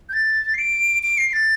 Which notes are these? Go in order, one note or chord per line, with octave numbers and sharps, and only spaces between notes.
G6
A6
C7
D7
D7
C7
A6